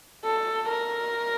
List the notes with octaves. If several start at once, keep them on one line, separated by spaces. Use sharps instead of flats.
A4
A#4